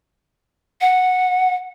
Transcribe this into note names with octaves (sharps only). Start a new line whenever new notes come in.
F#5